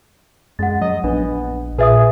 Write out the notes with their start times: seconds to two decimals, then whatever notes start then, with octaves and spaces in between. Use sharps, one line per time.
0.59 F#2 G#3 F#5 A6
0.82 F#3 D#5
1.04 A#1 B3 D4
1.78 A#2 G#4 B4 E5 D#6